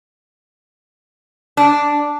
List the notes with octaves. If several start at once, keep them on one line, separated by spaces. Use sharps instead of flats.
D4